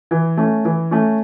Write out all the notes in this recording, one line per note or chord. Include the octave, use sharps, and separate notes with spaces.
E3
A3 C#4
E3
A3 C#4